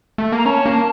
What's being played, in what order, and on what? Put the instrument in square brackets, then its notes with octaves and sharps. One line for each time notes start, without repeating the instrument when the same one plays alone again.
[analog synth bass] A3
[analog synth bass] A#3 [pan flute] A#5
[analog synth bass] C#4 [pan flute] A5
[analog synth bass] A#3